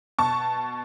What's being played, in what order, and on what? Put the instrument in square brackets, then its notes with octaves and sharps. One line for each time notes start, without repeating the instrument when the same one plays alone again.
[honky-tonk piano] B2 A5 C#6